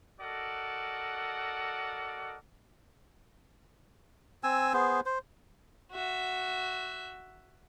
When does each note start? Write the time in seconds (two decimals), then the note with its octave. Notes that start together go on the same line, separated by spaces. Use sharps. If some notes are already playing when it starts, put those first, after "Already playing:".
0.21 F#4 A4 A#4 D5 D#5 F#5
4.44 C4 G#5 E6
4.74 B3 G#4 C5
5.06 C5
5.92 F#4 E5